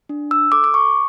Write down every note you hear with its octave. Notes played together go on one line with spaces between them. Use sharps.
D4
E6
A4 D6
D6
C#6